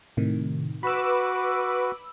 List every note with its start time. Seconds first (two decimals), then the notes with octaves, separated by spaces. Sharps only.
0.17 A2 C3 D#3
0.83 F#4 B4 B5 D6 E6